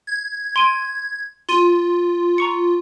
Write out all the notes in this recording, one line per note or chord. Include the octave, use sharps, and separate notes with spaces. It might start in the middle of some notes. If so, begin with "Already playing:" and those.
G#6
C6 D7 D#7
F4 C6 D#7
A#5 C#6 C#7